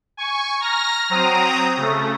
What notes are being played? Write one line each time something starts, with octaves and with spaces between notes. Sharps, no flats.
G#5 C#6
A#5 F6 A#6
F#3 C4 A#5 D#6
C#3 A3